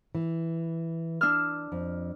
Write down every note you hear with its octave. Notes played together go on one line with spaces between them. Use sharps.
E3
D4 E6 F6
F2